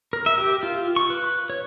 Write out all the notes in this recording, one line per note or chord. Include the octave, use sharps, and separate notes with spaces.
A#4
E5
G4
F4
C#6
B4
C#5